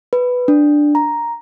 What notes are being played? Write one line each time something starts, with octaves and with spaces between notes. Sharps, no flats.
B4
D4
A#5